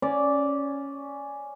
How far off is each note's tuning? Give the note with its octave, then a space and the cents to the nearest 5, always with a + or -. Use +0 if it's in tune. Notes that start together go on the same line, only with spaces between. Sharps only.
C#4 +0 D5 -10